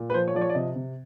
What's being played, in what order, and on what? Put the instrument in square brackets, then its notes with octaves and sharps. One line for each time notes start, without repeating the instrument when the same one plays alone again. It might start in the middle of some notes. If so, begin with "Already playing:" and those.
Already playing: [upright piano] A#2
B4
F3 C5
C#5
F3 D5
C#5
D5
C3 D#5
C3